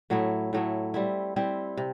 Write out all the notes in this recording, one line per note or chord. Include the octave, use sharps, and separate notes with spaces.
A2 F#3 A3 E4
A2 F#3 A3 E4
G3 C4 E4
G3 C4 E4
C3